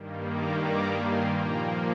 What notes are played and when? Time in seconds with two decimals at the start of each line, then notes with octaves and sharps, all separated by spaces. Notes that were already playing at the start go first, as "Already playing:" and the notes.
Already playing: G2 D#3 G3 A#3
0.26 A#5 D6
0.61 A#5 D6
0.98 G#5 C6
1.32 A#2 F3 A#3 G5 A#5